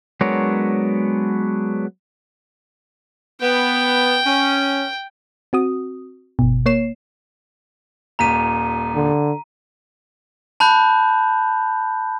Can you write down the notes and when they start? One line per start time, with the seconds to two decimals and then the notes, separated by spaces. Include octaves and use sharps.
0.21 F#3 G#3 B3 D4 A#4 C#5
3.41 B3 G5
4.25 C#4
5.53 C4 F#4 D#6
6.39 G1 B2
6.66 A#3 C#5 C7 E7
8.19 D#1 A#2 A#5 B6 D#7
8.95 D3
10.60 A5 B5 F#6 G6